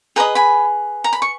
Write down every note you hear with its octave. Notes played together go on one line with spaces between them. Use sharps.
G#4 B4 D#5 G5 A#5
G#5 B5
A#5
B5
C#6